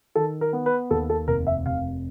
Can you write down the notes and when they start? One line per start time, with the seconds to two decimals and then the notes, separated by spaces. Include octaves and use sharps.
0.15 D#3 A4
0.41 A#4
0.53 B3
0.66 B4
0.91 D#2 A4
1.10 A4
1.28 F1 A#4
1.47 E5
1.65 C3 F5